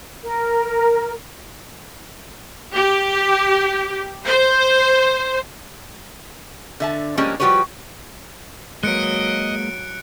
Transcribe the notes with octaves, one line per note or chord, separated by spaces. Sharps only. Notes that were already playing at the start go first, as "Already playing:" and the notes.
A#4
G4
C5
D3 E5 A5
F3 G3 G#3 A#3 C#4
F3 G3 F#4 G4 B4 C#5
F#3 G#3 A#3 B4 D#5 F#6 C#7 D7